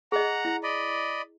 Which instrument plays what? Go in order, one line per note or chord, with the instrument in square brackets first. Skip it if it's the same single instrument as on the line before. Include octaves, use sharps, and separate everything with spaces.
[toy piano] G#4 D#5 [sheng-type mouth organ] F#5 A#5
[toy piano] E4
[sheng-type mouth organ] D5 D#5 B5